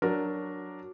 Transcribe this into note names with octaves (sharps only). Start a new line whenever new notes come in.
F#3 D4 A#4